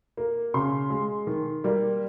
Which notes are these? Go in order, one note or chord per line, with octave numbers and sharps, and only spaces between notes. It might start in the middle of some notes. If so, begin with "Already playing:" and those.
A#3
C#3 C6
G#3
D#3
G3 A#3